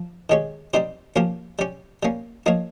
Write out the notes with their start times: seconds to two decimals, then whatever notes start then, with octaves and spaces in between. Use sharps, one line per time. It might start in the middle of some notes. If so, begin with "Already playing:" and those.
Already playing: F3
0.30 D#3 G#3 C#4 G4 C#5
0.74 G3 C4 D#4 G4 C5
1.16 F3 A#3 C#4 G4 A#4
1.59 G3 C#4 G4
2.03 G3 A#3 C#4
2.46 F3 A#3 D#4 A#4 C#5